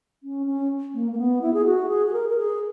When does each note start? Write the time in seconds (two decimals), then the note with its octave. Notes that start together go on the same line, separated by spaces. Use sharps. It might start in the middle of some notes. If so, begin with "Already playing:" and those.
0.23 C#4
0.46 C#4
0.94 A#3
1.12 A#3
1.18 B3
1.42 E4
1.54 G#4
1.65 F#4
1.89 G#4
2.07 G#4
2.13 A#4
2.29 A#4
2.37 G#4